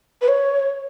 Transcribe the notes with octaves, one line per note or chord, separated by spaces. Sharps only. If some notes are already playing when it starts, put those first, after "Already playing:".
B4
C#5